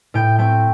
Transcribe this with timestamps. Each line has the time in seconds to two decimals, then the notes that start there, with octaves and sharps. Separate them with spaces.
0.14 A2 G5
0.38 A3 C4 G5